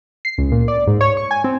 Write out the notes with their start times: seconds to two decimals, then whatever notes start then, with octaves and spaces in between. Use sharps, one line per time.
0.25 C7
0.38 C#2
0.52 A#2
0.68 D5
0.87 G#2
1.01 C#5
1.17 C#6
1.31 G#5
1.44 C4